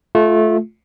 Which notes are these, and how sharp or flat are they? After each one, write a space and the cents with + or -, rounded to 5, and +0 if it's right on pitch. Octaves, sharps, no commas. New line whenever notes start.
A3 -20 F4 +0